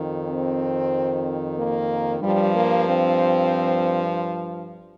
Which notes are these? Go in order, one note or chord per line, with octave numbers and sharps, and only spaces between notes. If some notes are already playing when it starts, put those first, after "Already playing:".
Already playing: F2 D#3
C4
A#3
G2 F3 G3
A#3
C4